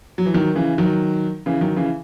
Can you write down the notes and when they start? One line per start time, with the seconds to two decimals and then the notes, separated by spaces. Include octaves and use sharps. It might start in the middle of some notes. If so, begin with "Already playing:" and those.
0.18 F#3
0.26 E3
0.34 D#3 F#3
0.55 C#3 E3
0.78 D#3 F#3
1.46 C#3 E3
1.61 D#3 F#3
1.76 C#3 E3